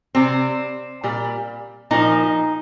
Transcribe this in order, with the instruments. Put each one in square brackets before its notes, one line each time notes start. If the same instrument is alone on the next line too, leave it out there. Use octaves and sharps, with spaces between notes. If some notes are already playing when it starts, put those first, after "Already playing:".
[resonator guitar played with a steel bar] C3 G3 C4
A#2 G3
A#2 F3 D#4